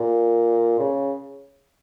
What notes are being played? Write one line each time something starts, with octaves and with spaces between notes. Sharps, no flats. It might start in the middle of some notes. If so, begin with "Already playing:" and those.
Already playing: A#2
C#3